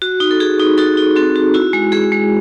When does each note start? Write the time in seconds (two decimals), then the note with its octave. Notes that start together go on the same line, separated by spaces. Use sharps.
0.02 F#4
0.20 D#4
0.31 A4
0.40 F#4 G#4
0.59 D#4
0.78 D#4 F#4 A4
0.97 D#4
1.16 C4 F#4 A4
1.36 F#4
1.54 E4 F#4
1.73 G#3
1.92 G#3 G#4
2.12 G#3